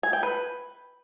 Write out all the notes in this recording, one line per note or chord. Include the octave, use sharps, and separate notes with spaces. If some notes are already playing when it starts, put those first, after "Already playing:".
G#5
G5
B4